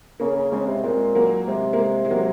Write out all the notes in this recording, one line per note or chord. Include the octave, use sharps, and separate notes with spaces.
C#3 A#3 C#4
C#3
C#3 G#3 C4
C3
A#2 G#3 C4
F#3 A#3
C3 G#3
A#3
G#3
G#3
F#3 A#3